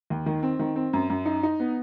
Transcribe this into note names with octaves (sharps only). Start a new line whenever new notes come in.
D#2
D#3
C4
D#3
C4
F#2
F#2
D#4
D#4
B3